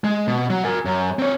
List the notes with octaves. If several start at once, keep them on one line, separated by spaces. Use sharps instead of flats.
G#3
B2
F#3
A#4 G#5
F#2
C4 C#5